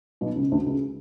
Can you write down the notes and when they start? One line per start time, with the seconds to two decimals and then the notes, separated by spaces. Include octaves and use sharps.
0.21 B1 B2
0.36 C#2 C#3
0.52 D2 D3
0.66 C#2 C#3